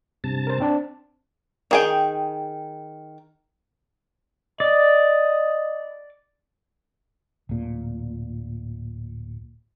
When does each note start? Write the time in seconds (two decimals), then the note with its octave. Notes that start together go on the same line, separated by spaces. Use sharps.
0.24 G2 C3 A5
0.47 A#4 C5
0.60 C4 D4 A5
1.71 D#3 G#4 G5
4.60 D5 D#5
7.49 D1 A#2